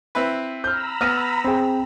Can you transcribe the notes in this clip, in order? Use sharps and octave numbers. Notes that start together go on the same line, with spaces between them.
C4 E4 B4
A#5 B5 E6 F6 G6
B3 F6 A#6 D#7
C4 G#4 C5 G5